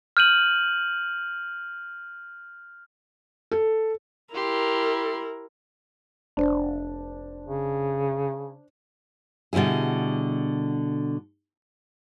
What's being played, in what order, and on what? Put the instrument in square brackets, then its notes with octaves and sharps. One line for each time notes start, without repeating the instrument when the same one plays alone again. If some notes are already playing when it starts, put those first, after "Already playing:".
[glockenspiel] F6 G6 D#7 F#7
[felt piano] A4
[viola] E4 A#4 [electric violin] G4 C6
[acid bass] F1 [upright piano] D4 C5
[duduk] C#3
[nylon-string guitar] B2 D3 G3 E4 G#4